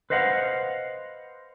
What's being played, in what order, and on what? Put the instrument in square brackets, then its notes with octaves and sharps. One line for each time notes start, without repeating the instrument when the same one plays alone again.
[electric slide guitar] B4 C5 D#5 F5 F#5